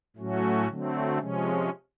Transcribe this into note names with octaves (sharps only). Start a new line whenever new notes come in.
A2 F#3 A3 C#4 F#4
D3 F#3 A3 C4
C3 F3 G#3 C#4